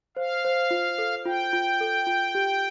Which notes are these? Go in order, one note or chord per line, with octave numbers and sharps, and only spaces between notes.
C5 F5
C5
F4
A4
F4 G5
F4
A4
F4
G4